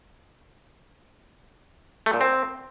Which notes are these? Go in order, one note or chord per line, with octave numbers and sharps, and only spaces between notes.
A3
A#2
C4